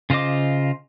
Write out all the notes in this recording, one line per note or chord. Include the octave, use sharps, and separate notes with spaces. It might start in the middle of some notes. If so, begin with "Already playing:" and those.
C#3 F4 C5 D#5 D6